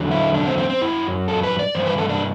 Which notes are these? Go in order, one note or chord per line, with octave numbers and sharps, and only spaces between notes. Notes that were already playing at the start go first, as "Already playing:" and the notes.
Already playing: E2 D3 F#3
E4
D4
C4
C4
C4
F#2 F#3 E4
A4
B4
D5
G2 E3 C5
B4
A4
D4